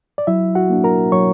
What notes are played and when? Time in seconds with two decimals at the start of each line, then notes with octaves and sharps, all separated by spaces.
0.18 D5
0.27 F#3 E4 E5
0.55 F#4 F#5
0.70 A#3 D4
0.84 A#4 A#5
1.12 F#3 C#5 C#6